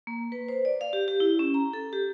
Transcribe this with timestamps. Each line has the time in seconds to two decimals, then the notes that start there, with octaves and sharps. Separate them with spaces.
0.07 A#3
0.32 B4
0.48 C5
0.65 D5
0.81 F5
0.93 G4
1.08 G4
1.20 E4
1.39 C#4
1.54 A#5
1.73 A4
1.93 G4